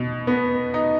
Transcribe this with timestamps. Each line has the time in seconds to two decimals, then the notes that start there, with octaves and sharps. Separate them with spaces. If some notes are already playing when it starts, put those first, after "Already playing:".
Already playing: B2
0.27 B3
0.74 D#4